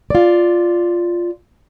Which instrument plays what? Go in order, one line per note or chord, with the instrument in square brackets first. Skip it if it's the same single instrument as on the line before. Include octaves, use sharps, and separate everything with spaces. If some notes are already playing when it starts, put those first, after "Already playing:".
[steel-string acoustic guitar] F4 D5